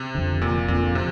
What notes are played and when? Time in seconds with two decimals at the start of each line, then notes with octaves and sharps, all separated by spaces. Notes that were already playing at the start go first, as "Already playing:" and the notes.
Already playing: C3
0.15 F2 D3
0.41 F1 A#2
0.68 F2 A#2 D3
0.95 C3